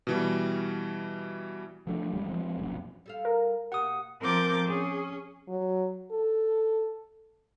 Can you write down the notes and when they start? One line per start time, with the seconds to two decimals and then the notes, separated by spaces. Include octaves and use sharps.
0.07 B2 E3 G3
1.87 F3 F#3 A3 D4
2.13 A1 E2 G3 G#3
2.29 F3 G#3 C4
2.58 E1 A#1 F#2
3.06 G3 A4 F5
3.25 A#4
3.72 B2 A#3 G4 F#5 D#6
4.21 F3 C4 A#4 D6 G6 A6
4.67 C#4 G#4
5.48 F#3
6.11 A4